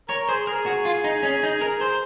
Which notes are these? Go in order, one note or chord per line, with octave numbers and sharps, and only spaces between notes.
A#4 C#5
G#4 C5
G#4 A#4
F#4
F4
D#4
C#4
D#4
A#4
C5